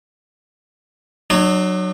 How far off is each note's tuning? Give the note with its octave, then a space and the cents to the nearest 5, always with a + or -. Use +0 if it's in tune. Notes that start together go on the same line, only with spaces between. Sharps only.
F#3 +0 D4 +45